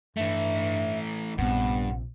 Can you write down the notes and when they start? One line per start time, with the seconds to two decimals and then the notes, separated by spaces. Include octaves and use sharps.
0.17 G2 E3 A3 E5
1.38 A#1 G2 C3 B3 F#5